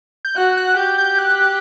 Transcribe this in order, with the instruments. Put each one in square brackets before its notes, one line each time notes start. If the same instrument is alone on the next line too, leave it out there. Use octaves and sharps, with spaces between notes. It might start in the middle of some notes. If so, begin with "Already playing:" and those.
[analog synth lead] G6
[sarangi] F#4 [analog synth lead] F#6
[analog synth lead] F#6
[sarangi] G4 [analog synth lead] G6
[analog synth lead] G6
F#6